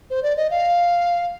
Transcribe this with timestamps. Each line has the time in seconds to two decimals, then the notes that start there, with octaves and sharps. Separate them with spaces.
0.10 C5
0.23 D5
0.37 D#5
0.51 F5